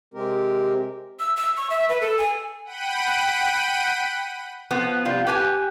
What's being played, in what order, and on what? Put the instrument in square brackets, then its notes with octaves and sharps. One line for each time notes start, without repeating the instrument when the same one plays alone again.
[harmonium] C3 G#3 C4 G4 A#4
[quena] E6
E6
C#6
E5
B4
A4
G#5
[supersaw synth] F#5 G5 B5 D#7
[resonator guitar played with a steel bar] F3 B3
C3 G3 F4
G4 B4 G5 G#5